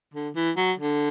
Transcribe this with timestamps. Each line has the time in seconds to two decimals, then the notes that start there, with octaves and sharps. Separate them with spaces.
0.14 D3
0.35 E3
0.57 F#3
0.79 D3